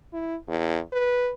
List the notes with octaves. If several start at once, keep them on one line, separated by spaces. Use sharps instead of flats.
E4
E2
B4